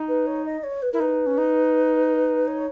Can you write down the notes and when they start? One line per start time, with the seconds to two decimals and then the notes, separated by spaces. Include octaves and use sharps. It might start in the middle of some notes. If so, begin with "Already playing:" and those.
Already playing: D#4
0.08 B4
0.27 C#5
0.45 D#5
0.63 C#5
0.82 B4
0.92 E4 A#4
1.00 D#4 B4
1.26 C#4
1.38 D#4
2.47 C#5